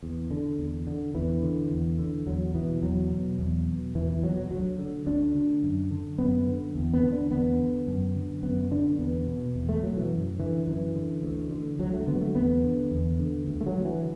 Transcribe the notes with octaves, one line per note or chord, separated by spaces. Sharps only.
E2
D3
E2
D3
E2 E3
D3
E2
D3
E2 F#3
B2 E3
E2 F#3
B2
E2
B2
E2 E3
E3
B2 F#3
F#3
D2 F#3
D3
D2 D4
D3
F#2
D3
F#2 B3
D3
E2
B3
D3
D4
E2 B3
D3
F#2
D3
F#2 B3
D3 D4
E2 B3
B2
E2
A3
B2 F#3
E3
F#2
D3 E3
F#2 E3
D3
D2
D3
D2 F#3
A3
D3 B3
F#3
A3
E2 B3
D3
E2
D3
D2
A3
F#3
D3
E3